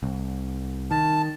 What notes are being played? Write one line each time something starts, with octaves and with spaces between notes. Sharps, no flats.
C2
D#3 A5